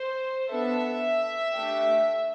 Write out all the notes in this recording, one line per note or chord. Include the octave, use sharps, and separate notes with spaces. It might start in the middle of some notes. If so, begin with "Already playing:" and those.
Already playing: C5
B3 D4 A4 E5
A3 D4 G4